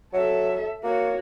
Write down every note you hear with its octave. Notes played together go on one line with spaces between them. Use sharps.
F#3 A4 E5
A#3 F#4 C#5